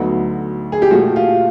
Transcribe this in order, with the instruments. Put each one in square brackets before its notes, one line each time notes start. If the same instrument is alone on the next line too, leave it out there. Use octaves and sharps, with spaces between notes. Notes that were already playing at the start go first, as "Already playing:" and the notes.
Already playing: [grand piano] D2 D3 F#3 B3 D#4
[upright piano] G#4
G4
[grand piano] A#2 F3 A3 [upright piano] F#4
[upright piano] F4